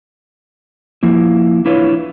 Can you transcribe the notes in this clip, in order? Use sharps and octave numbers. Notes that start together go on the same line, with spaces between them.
F3 A#3 E4
D4 E4 F4 B4 C#5